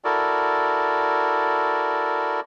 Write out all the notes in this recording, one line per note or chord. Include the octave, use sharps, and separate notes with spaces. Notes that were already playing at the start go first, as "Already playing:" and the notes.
E4 F#4 A4 A#4 D5